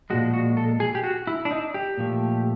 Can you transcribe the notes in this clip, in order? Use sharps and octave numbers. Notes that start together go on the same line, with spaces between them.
A#2 F3 G#3 F#4
F#4
A4
G#4
G4
F#4
E4
D4
D#4
G4
A#2 F3 A3